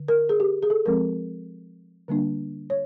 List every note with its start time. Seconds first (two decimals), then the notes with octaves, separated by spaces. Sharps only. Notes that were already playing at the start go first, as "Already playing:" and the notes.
Already playing: D3
0.08 A#4
0.29 G#4
0.40 G4
0.63 G#4
0.70 A4
0.86 F3 G#3 C4 A#4
2.08 D3 G3 A#3 D4
2.70 C#5